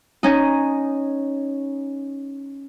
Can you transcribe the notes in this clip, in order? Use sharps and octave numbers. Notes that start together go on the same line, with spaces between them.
C#4 D#4